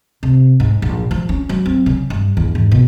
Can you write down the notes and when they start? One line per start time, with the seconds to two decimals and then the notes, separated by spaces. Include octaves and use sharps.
0.23 C3
0.60 G#2
0.82 A#1
1.11 F3
1.29 C#4
1.49 F#3
1.66 C4
1.86 C#3
2.10 G2
2.37 E2
2.55 G#2
2.72 B2